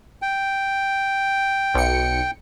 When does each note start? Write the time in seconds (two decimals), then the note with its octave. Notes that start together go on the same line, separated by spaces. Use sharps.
0.22 G5
1.74 B1 C#7